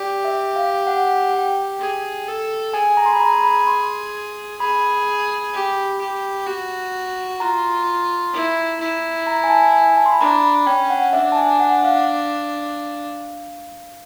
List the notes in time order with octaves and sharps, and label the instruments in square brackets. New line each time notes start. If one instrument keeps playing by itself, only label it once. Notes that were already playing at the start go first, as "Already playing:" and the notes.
Already playing: [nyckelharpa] G4 [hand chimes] D5
[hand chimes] E5
F5
F#5
G5
[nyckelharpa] G#4
A4
[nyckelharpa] G#4 [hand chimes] G#5
[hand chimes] A#5
C6
B5
A#5
B5
C6
[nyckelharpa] G#4 [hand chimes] B5
[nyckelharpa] G4
G4
F#4
[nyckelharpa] F4 [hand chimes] A#5
[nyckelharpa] E4
E4
[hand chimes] A#5
G#5
A5
G#5
A5
C6
B5
[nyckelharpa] D4 [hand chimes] A#5
[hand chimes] B5
[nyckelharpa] C#4 [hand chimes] G5
[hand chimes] F#5
[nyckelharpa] D4 [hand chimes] E5
[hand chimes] A5
G#5
F#5
F5